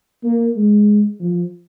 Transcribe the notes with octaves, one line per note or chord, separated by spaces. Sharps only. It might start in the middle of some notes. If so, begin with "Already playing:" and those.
A#3
G#3
F3